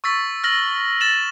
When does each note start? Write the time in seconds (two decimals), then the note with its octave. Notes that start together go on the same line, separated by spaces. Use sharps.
0.04 C#6 E6 A6 B6
0.44 F6 A#6 F#7
1.01 A6 E7 F#7